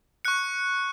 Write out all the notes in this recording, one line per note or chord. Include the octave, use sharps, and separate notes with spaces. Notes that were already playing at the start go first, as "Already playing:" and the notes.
C#6 F#6 C#7